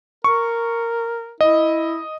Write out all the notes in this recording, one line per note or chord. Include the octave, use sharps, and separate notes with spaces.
A#4 C#6
E4 D#5